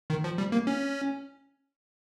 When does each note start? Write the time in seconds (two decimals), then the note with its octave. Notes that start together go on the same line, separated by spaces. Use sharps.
0.10 D#3
0.24 F3
0.38 G3
0.52 A#3
0.67 C#4